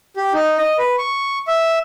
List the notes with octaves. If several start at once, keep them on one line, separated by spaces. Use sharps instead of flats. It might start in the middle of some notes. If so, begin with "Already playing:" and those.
G4
D#4
D#5
B4
C#6
E5